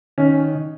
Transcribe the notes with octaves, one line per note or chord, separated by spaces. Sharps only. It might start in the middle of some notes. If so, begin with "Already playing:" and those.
D#3 C#4